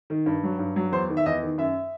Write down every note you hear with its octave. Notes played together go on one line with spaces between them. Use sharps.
D#3
G2
F#3
G2
F#3
E2 C5
D#3
E5
E2 D#5
D#3
F#2 E5